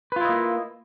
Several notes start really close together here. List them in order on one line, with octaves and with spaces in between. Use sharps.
B4 F4 E4 D#5 A#3